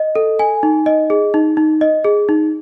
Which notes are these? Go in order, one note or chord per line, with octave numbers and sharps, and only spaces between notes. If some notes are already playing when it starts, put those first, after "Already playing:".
Already playing: D#5
A4
G#5
D#4
D#5
G#4
D#4
D#4
D#5
G#4
D#4